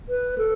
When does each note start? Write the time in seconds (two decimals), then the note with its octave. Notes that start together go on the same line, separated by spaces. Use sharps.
0.09 B4
0.38 A4